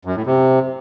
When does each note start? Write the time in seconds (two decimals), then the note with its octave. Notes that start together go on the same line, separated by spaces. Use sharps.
0.05 F#2
0.16 A2
0.26 C3